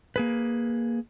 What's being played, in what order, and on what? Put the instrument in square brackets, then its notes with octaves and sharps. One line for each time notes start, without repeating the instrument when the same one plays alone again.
[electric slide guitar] A#3 G#4 B4